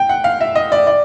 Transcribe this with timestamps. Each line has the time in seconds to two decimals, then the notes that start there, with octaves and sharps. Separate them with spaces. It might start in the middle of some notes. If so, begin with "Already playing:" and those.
Already playing: G5
0.09 F#5
0.24 F5
0.41 E5
0.55 D#5
0.72 D5
0.87 D5